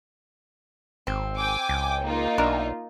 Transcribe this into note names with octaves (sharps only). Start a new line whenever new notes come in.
G#1 C4
G5 G#5 D6
C#2
A#3 D#4 F4
B1 D4 A#4 E5